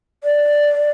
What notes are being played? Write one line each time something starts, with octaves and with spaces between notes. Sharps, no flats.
D5